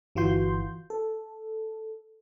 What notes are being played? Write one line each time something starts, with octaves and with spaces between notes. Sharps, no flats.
G1 E3 F4 F#4 C6 G6
A4